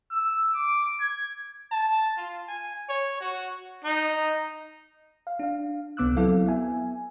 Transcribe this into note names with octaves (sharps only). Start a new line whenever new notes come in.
E6
D6
G#6
A5
F4
G#5
C#5
F#4
D#4
F5
D4 F5
C#2 C3 B3 D6 E6 F#6
F#3 C4 E4 A4 F5
B3 E5 G#5